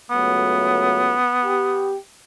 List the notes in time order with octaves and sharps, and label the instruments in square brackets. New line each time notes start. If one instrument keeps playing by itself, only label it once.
[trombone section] C#2 F#3 A3 [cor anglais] B3
[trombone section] G4